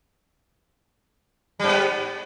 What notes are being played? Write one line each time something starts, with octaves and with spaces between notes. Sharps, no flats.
G#2 G3 B3